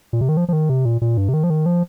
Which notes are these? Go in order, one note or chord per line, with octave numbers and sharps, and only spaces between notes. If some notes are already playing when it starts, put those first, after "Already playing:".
A#2
C3
D#3
F3
F3
D#3
C3
A#2
A#2
G2
C3
D#3
F3
D#3
F3